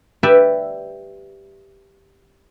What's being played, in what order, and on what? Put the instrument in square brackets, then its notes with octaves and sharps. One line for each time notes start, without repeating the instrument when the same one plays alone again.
[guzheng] G4 B4 D5 E5